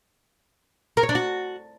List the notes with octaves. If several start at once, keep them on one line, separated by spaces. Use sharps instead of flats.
A#4
C#5
D4
F#4